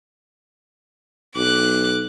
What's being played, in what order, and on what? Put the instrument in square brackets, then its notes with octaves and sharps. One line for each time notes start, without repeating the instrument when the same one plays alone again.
[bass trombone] B1 [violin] D6 F#6